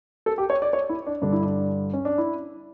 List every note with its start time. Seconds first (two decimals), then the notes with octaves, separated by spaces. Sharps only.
0.26 A4
0.38 G4
0.50 C#5
0.62 D5
0.73 C#5
0.89 E4
1.07 D4
1.22 G2 D3 D4
1.32 E4
1.42 D4
1.93 C#4
2.05 D4
2.18 E4